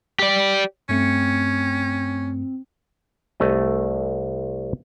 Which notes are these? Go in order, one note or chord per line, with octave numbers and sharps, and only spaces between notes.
G4 D5
G2 A3 C4 C#4 C#7
C2 A3 D#5